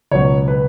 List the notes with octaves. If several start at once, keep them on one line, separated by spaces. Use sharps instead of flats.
C#2 B2 F#3 C#5
B4